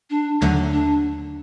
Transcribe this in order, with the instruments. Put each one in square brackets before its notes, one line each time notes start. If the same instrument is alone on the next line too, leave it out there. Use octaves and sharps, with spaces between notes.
[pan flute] D4
[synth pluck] D#2 D3 F#3 A3
[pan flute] D4